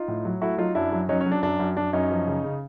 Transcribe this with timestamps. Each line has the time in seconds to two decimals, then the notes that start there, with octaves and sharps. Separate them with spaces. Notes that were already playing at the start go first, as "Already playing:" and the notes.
Already playing: D#4 F4
0.08 A2
0.25 F#3
0.41 A3 E4 F#4
0.58 F#3 D#4 F4
0.75 F#2 D4 E4
0.92 F#3
1.09 F#3 C#4 D#4
1.21 C#4
1.26 F#3
1.31 D4
1.43 F#2 D4
1.59 F#2
1.77 F#2 D4
1.93 F#2 C#4 D#4
2.11 F3
2.27 C#3
2.44 C#3